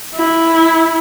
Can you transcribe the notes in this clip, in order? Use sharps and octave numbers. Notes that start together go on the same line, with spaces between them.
E4